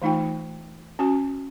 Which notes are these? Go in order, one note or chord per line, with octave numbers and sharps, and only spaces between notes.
E3 A3 D#4 F4 G5
C#4 F#4 G#5